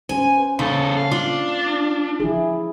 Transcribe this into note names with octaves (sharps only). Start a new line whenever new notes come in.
C#4 C5 G#5
B4
E2 C#3 A#3 A4
F5
D4 F4
F3 E4 G#4